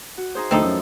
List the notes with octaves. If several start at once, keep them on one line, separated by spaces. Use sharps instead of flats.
F#4
D#4 G#4 C5
D2 A2 E3 F3 C4 D#4 A4
F#2